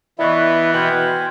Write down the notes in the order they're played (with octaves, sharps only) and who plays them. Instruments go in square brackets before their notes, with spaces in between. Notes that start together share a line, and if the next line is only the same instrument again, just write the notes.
[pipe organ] E3 B3 [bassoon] E4 [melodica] B4 [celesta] D5 D#5 C#6
[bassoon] B2 [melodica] C5 G5 G#5 [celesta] F6 G6 F#7